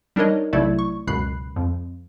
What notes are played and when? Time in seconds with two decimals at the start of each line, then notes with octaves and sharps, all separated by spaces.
0.16 G3 D4 D#4 A#4 C#5 D#5
0.53 B1 C3 A3 E4 D5 G#6
0.79 C#6
1.07 C#2 F#2 B2 B5 F#6 C7
1.56 F2